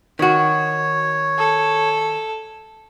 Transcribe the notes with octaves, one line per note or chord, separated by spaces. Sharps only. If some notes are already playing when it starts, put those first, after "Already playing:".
D#3 F#4 C#5
A4